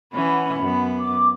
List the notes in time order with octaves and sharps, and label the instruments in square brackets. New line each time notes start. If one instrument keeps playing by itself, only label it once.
[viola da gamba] E3 C#4 [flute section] F#5 B5
[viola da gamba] F#2 B3
[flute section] D6